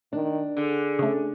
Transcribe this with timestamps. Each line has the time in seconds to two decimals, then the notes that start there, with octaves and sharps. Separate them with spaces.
0.13 D#3 D4
0.57 D3 G#4
0.99 C#3 A3